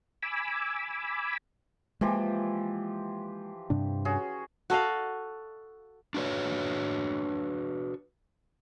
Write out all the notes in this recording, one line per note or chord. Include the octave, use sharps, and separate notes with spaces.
G#5 B5 D6 E6
E3 F3 G#3 A#3 G4
G2 C3 D4
C#4 F#4 G#4
F#4 A4 D#5 F5
D4 F#4 B4 C#5